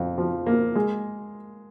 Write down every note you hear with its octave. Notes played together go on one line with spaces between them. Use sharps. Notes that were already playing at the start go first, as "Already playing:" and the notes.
Already playing: F2
F3
A#3
G#3